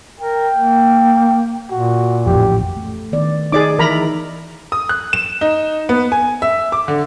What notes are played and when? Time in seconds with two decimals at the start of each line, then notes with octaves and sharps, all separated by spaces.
0.20 A#4 G5
0.55 A#3
1.71 A#2 F#4
2.26 A1 F2 G4
2.77 A3
3.12 D#3 B3 D5
3.52 D#4 G#4 D5 D6
3.79 E3 G#4 A#4 E5 A#5 B5
4.72 D#6
4.89 F#6
5.13 E7
5.41 D#4
5.89 B3
6.12 G#5
6.42 E5
6.72 D6
6.88 D3